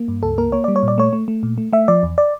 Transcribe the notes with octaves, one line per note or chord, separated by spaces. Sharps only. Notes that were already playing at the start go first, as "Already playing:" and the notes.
Already playing: A#3
G2
C#2 A4
A#3 A#4
A#3 C#5
G3 D5
C#5
A#2 D5
A3 C#5
A3
A3
A#2
A3
A3 E5
F3 D5
E2
D5